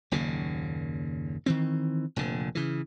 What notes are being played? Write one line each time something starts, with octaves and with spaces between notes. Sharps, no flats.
F#1 D#2 A#2 C#3
D#3 E3 C4
F1 A#2 D3
C#3 E3